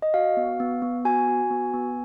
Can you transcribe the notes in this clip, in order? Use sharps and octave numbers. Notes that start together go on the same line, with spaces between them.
D#5
F#4 F5
B3
B3
B3
F#4 G#5
F#4
B3
B3